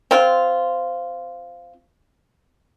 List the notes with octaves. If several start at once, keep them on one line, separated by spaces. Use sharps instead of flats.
C4 F4